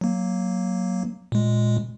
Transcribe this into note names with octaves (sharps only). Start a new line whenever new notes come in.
F#3 A#3
A#2 G#3